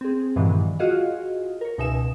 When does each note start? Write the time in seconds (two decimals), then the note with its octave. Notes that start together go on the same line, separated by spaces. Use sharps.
0.01 C4 G#4
0.36 G2 A#2 D#3 E3 F#3 G#3
0.79 F4 F#4 G#4 D#5 F5
1.61 A#4 C#5
1.78 C#2 B2 D#4 E5 G#5 E7